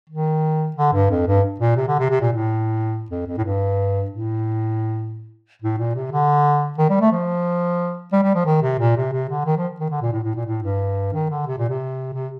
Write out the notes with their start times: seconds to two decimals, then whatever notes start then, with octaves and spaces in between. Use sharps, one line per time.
0.09 D#3
0.76 D3
0.93 G2
1.10 F2
1.27 G2
1.60 A#2
1.76 C3
1.88 D3
1.99 C3
2.10 C3
2.21 A#2
2.32 A2
3.10 F2
3.27 F2
3.38 A2
3.44 G2
4.10 A2
5.62 A2
5.78 A#2
5.95 C3
6.12 D3
6.78 D#3
6.90 G3
7.01 A3
7.11 F3
8.13 G3
8.23 G3
8.34 F3
8.46 D#3
8.62 C3
8.79 A#2
8.96 C3
9.13 C3
9.29 D3
9.46 D#3
9.57 F3
9.80 D#3
9.90 D3
10.02 A#2
10.12 A2
10.23 A2
10.35 A#2
10.46 A2
10.63 G2
11.13 D#3
11.30 D3
11.47 C3
11.58 A#2
11.69 C3
12.14 C3